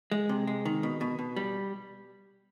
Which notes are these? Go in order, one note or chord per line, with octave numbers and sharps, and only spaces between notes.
G#3
C3
G#3
D#3
B2
B2
B2
G3